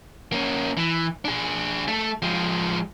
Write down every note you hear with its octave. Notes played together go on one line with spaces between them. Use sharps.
A#3 C#4
E3
D4 G#4
A3 A4
F3 G#3